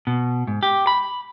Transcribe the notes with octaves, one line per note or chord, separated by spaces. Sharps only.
B2
G#2
G4
B5